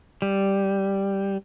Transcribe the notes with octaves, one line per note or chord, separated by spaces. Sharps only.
G3